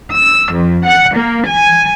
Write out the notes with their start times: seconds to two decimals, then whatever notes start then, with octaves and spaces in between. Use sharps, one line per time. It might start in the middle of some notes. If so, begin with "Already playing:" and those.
0.15 E6
0.53 F2
0.86 F#5
1.16 A#3
1.47 G#5